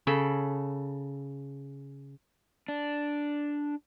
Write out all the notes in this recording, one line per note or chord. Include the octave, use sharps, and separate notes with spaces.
C#3 A4 B5
D4